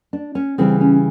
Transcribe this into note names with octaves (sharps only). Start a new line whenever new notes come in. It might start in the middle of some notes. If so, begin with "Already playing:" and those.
D4
C#4
C#3 E3 G3 C4
C#4